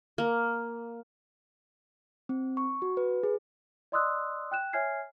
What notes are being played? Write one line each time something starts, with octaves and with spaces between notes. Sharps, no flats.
A#3
C4
C#6
F#4
B4
G#4
D5 D#5 C6 D#6 E6 F#6
G5 F#6 E7
C#5 E5 G#5 F6 G#6 C7